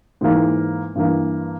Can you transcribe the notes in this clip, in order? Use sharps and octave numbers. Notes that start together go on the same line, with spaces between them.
G#2 E3 A#3
G2 E3 A#3